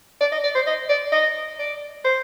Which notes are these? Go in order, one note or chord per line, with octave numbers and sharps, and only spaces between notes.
D5
D#5
D5
C5
D#5
D5
D#5
D5
C5